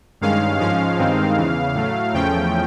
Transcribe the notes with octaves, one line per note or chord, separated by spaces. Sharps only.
G2 D#3 G#3 C#4 F5
G#2 F3 G#3 C#4 F5
G2 D#3 G#3 C4 D#4
E2 C#3 E3
A2 F#3 A3
E2 C#3 F3 A3 C#4 G5